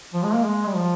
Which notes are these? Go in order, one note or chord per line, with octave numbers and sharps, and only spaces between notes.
F3
G#3
A#3
G#3
G3
F3